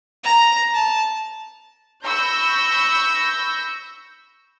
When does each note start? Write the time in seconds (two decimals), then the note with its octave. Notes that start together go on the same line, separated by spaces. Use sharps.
0.24 A#5
0.74 A5
2.04 B5 C#6 E6 G6 A#6